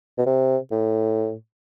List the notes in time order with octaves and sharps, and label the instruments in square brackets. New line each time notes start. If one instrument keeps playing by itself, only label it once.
[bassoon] B2
C3
A2